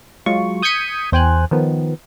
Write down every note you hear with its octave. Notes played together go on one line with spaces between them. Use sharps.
F#3 G#3 F4 C#6
D#6 G6 G#6 B6 C#7 D#7
E2 C5 G5 G#5 F#6
D#3 F3 B3